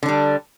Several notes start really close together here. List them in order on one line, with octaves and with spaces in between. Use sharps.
D3 D4 G3